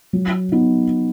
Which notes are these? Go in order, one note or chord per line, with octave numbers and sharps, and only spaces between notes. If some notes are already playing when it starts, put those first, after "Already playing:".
F#3
B3 D#4